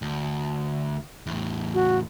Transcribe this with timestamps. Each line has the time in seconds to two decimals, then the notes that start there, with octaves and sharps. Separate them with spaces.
0.02 D2
1.27 E2 A2
1.74 F#4